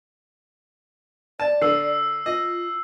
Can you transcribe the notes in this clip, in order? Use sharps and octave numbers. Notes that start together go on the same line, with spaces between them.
D5 A5
D3 E6 C7
F4 D#5